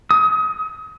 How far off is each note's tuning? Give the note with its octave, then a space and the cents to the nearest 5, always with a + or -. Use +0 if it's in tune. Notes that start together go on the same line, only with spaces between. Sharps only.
D#6 +35